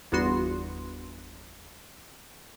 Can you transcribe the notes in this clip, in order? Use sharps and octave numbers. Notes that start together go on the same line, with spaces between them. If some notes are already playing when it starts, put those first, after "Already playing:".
G1 E2 B3 F#4 C6